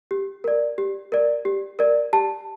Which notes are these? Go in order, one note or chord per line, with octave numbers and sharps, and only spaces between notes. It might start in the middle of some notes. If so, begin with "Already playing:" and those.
G4
A#4 D5
G4
A#4 D5
G4
A#4 D5
G4 A5